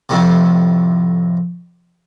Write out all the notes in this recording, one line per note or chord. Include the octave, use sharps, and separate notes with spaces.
F2 A2 C3